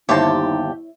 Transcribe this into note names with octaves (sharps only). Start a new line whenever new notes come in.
G1 D#2 D#4 E4 G4 C5 C#5 A5